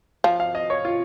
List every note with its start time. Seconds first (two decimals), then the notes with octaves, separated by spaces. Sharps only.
0.24 F3 F5
0.40 F5
0.55 D#5
0.70 C#5
0.85 F4